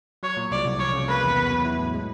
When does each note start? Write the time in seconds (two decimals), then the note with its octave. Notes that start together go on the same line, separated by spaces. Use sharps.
0.23 F#3 C#5
0.37 A#2
0.52 C2 D5
0.65 C2
0.80 F3 C#5
0.93 C#3
1.08 A#3 B4
1.23 E2
1.37 B3
1.50 F#3
1.65 E4
1.79 A2
1.94 G#3